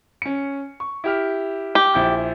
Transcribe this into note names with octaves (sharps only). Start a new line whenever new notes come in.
C#4 C#7
C#6
E4 G4 F6
G4
A#1 E4 G6